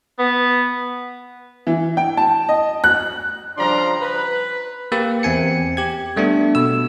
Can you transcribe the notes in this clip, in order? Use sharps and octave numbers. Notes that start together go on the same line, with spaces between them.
B3
E3
G5
A5
D#5
F#6
C#3 F3 G3 D4 A#5 C6
B4
A#3 G4 B4
E2 C4 G#5 C#7
G4 G#6
G3 A3 B3 D4
B2 E6